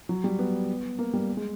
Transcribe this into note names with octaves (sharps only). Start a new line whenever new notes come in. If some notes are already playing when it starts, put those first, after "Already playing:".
F#3
G3
B3
A#3
G3
G#3